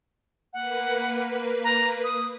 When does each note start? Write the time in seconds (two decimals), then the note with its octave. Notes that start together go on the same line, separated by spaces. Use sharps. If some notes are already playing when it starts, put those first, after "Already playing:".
0.53 A#3 B4 F#5
1.64 A#5
2.04 D#6